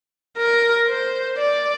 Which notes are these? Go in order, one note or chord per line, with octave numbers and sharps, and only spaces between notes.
A#4
C5
D5